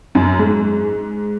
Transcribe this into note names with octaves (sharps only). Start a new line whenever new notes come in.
F#2
G#2